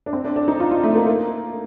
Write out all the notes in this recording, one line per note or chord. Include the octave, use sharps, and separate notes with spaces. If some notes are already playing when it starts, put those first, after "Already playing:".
D4
C4
D4
D4
D#4
F4
F4
A3
A#3
A#3